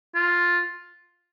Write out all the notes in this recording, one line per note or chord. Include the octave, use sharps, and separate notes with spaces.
F4